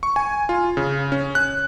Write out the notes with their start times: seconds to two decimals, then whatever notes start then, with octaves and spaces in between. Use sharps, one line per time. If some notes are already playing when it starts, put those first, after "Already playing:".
0.03 C#6
0.16 G#5
0.49 F4
0.77 C#3
1.12 C#4
1.35 F#6